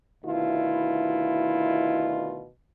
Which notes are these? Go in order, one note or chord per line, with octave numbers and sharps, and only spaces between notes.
D2 B2 D#3 E4 F4